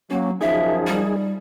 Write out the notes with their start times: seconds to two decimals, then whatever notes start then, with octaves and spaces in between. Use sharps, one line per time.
0.11 F#3 A#3 C#4
0.41 F#2 D#3 F3 D#4 G#4 E5
0.87 G3